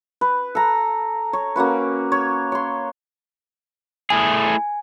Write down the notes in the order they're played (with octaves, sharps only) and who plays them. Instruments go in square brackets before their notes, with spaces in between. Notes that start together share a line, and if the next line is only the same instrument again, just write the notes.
[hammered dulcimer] B4
A4 A#5
C#5
A#3 C#4 F#4 B4
C#5
C#5 C6
[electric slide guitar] A3 E4 G#4 [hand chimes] G#5